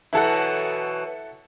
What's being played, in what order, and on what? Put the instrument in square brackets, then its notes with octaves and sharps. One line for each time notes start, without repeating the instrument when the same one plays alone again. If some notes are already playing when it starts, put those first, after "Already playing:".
[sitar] B2 E3 F#3 [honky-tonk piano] E4 A4 F#5